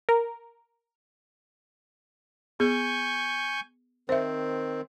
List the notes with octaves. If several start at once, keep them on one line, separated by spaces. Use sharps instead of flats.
A#4
B3 G#4 G#5 C#6 G6
D#3 C4 C5 E5